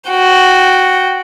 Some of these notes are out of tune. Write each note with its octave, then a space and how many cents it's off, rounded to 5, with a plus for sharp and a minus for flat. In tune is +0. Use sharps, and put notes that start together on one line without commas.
F#4 +0 G5 -10